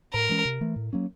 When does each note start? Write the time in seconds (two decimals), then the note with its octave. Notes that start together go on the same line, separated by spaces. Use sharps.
0.13 A2 A#4
0.29 E3 G#3 C#4
0.45 C3
0.61 E3 A3
0.76 A2
0.93 F#3 A#3 C#4